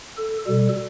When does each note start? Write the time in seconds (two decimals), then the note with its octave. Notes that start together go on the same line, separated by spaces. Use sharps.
0.17 A4
0.47 B2 G3 A4